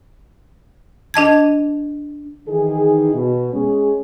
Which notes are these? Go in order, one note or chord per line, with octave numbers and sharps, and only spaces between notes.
D4 D#5 A5 G#6
D#3 E3 D#4 G#4
B2
G#3 C#4 G#4